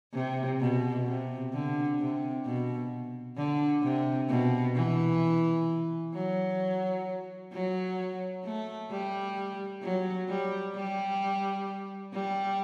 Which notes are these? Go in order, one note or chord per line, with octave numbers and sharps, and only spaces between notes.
C3
B2
C3
D3
C3
B2
D3
C3
B2
E3
F#3
F#3
A3
G3
F#3
G3
G3
G3